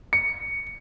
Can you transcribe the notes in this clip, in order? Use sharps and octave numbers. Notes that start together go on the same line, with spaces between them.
C#7